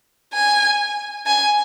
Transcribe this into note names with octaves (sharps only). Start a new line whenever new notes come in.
G#5
G#5